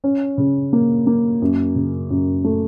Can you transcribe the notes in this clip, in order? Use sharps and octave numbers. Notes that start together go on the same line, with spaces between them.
C#4
C#3
A#3
A#3
F#2
C#3
F#2
A3